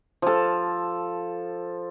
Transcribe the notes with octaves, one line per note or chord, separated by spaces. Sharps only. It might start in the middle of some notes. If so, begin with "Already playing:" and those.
F3 A4